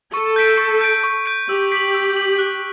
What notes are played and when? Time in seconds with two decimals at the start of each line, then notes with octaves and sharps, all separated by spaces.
0.13 A4 C#6
0.36 G6 B6 D7
0.58 C#6
0.81 G6 D7
1.04 C#6
1.26 G6 D7
1.49 G4 E6
1.72 B6 F#7
1.94 E6
2.16 B6 F#7
2.38 F#6